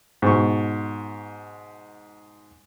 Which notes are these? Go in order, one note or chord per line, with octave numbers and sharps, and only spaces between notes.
G#2 B2 C#6